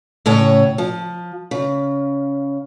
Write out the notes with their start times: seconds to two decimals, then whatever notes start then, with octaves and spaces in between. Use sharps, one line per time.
0.26 A2 C#3 C#5 F#5
0.78 F3
1.51 C#3